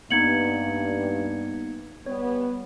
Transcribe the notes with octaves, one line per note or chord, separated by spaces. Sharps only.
G2 A#3 B3 D#4 G#6 C#7 F#7
G3 B3 C#5